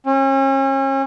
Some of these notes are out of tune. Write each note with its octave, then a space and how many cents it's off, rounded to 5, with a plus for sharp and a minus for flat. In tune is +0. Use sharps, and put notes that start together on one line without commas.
C#4 -40